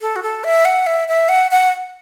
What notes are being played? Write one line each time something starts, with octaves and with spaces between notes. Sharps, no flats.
A4
F#4
A4
E5
F#5
E5
E5
F#5
F#5